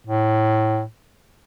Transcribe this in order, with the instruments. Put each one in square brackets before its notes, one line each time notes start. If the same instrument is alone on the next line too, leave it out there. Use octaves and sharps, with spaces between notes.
[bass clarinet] A2